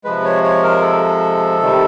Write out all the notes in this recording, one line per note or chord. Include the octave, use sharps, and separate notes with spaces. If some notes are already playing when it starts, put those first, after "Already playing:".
C3 F3 G#3 B4
C#5
C#5
A#4
A4
C3 D#3 G3